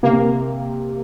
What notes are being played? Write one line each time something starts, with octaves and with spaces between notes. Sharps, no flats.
C3 A#3